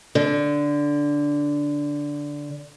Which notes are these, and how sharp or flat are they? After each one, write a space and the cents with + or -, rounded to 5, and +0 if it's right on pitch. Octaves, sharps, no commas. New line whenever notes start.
D3 -10